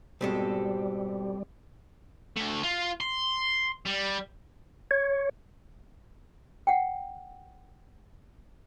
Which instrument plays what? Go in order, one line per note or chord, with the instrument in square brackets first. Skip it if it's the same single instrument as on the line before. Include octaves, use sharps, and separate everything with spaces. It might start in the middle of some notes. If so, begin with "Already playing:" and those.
[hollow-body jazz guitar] G#2 B2 G#3 [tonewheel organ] G3 [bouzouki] C4 G4 A4
[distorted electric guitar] D2 A3
F4
C6
G3
[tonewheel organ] C#5
[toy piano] F#5 G5